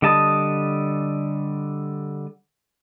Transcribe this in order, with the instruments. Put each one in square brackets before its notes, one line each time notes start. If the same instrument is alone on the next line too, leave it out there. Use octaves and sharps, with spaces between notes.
[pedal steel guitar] D3 G3 D#5 A5 D#6